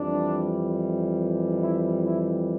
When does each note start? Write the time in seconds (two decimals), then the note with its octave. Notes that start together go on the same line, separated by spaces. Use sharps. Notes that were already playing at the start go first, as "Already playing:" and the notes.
Already playing: F2 E3 G3 D4
1.60 E4
2.04 E4